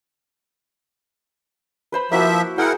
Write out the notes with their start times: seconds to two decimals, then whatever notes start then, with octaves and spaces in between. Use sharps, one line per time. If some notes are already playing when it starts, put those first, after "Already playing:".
1.92 B4 C5 B5
2.12 F3 A#3 E4 F#4 E5
2.58 E4 G#4 A#4 F#5 G5